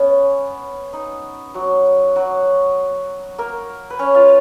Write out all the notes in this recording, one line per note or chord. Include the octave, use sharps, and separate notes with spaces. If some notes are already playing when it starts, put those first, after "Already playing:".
Already playing: B3 C#4
D#4
F#3 F#4
F#3 F#4
A#3 A#4
B4
C#4 C#5
F4 F5